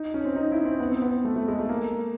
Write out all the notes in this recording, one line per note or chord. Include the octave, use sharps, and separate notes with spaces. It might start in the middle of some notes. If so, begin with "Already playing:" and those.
Already playing: D#4
C#4
C4
D#4
E4
C4
B3
C4
B3
A3
A3
G#3
A3
A#3